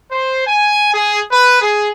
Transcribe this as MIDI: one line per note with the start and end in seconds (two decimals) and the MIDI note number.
0.11 0.42 72
0.47 0.89 80
0.93 1.20 68
1.30 1.58 71
1.61 1.88 68